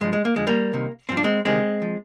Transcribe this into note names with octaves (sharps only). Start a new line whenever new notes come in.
G2 F3 G#3
G#3
A#3
F2 D3 F3 G#3
G3 A#3
C2 C3 D#3
G2 F3 C4
D4
G#3 C4
D2 C3 D#3 G#3 C4
F3